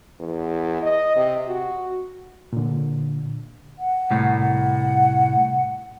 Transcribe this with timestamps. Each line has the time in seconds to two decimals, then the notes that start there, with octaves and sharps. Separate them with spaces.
0.20 E2
0.82 D#5
1.16 C3
1.47 F#4
2.53 A#2 D3
3.79 F#5
4.11 C2 A2
4.39 F#5